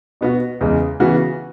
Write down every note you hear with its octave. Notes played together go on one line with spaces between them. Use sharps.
B2 B3 F#4
E2 C#3 G#3
C#3 E3 B3 F#4